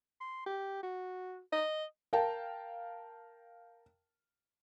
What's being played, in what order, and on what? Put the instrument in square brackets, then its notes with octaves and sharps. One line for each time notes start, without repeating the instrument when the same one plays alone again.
[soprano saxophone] C6
G4
F#4
D#5
[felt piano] A#4 F5 G5 A5